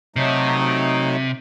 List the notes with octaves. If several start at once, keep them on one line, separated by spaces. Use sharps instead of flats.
C3 F#3 A3 D#4